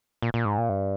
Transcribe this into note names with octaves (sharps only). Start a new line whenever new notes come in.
A#2
A#2
G#2
A#2
G2